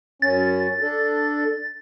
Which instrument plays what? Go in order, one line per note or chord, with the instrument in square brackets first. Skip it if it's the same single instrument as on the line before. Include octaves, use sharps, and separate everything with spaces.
[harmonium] F#2 C#4 [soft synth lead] A6
[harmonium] D4 A4